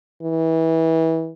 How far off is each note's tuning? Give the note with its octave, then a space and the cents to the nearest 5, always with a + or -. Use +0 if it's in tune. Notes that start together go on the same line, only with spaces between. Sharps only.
E3 -25